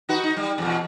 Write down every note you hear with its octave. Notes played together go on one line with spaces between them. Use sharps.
D#4 F#4 B4
D#4
G3
E2 B2